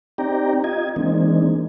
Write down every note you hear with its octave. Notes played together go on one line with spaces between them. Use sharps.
C4 D#4 G4 D5 G5 A#5
F4 D#5 G#6
E3 G#3 A#3 C4 D4 D#4